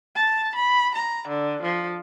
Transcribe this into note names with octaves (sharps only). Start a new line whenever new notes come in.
A5
B5
A#5
D3
F3